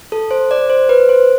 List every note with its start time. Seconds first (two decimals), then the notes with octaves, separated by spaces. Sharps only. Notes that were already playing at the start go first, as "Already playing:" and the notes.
0.12 A4
0.31 C5
0.51 D5
0.70 C5
0.89 B4
1.09 C5